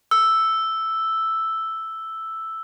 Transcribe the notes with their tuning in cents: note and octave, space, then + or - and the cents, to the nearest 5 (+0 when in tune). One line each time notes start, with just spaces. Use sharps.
E6 +0